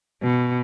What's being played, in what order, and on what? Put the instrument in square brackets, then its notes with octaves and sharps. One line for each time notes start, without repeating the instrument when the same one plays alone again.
[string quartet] B2